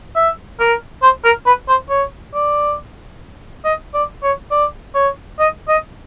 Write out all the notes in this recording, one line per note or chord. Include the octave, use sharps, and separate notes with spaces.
E5
A#4
C5
A#4
B4
C5
C#5
D5
D#5
D5
C#5
D5
C#5
D#5
D#5